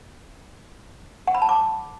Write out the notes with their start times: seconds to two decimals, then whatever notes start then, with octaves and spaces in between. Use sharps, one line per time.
1.27 F#5
1.35 B5
1.42 A5
1.49 D6